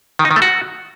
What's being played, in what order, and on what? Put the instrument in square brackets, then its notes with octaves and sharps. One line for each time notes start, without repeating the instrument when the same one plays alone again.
[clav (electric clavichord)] D#3
D#4
D#3
A3
F#4